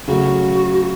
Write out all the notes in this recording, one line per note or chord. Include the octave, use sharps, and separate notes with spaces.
C#3 F#3 A3 F#4